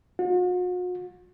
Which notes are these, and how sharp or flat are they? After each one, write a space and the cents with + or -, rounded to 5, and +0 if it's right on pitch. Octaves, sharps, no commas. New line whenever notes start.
F#4 -45